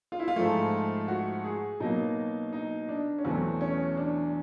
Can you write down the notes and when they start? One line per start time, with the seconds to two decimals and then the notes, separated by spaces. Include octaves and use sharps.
0.12 F4
0.19 E4
0.28 F4
0.36 G#2 F3 A3
1.08 F#4
1.44 G#4
1.80 B2 F#3 A#3 D#4
2.53 D#4
2.89 D4
3.18 C#4
3.25 E2 B2 F#3 A3 C4
3.61 C#4
3.97 D4